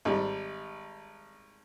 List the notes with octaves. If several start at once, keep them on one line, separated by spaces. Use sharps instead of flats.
G#1 G3